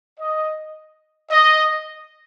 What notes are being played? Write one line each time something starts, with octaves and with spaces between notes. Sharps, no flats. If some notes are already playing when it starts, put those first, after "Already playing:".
D#5
D#5